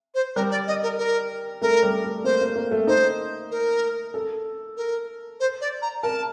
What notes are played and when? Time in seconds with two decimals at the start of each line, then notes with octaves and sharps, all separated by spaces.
0.15 C5
0.36 G3 A#4
0.51 D5
0.67 D#5
0.83 A#4
0.99 A#4
1.62 A3 A#4
1.83 G3
2.04 A3
2.24 A#3 C5
2.41 A#3
2.56 A#3
2.71 A3
2.87 D#4 C5
3.51 A#4
4.14 A4
4.77 A#4
5.40 C5
5.61 D5
5.82 A#5
6.03 A#4 A5